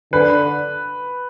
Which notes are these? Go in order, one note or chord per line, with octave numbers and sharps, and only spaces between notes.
D3 B4